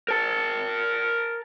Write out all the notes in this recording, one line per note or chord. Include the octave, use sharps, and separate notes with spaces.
A#4 A5